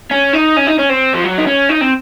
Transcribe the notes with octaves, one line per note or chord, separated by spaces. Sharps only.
C#4
D#4
C#4
D#4
C#4
C4
F3
F#3
D#4
C#4
D#4
C4